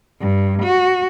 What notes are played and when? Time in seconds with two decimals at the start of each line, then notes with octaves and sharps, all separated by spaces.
0.21 G2
0.63 F#4